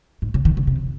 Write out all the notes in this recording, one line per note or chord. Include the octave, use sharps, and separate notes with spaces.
G#2
C#3
D#3
C#3
C3